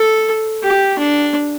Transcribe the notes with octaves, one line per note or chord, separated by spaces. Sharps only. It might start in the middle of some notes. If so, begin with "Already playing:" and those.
Already playing: A4
G4
D4